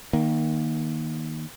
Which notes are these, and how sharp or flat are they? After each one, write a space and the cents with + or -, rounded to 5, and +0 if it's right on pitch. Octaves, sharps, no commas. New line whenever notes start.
D#3 +0 A#3 +10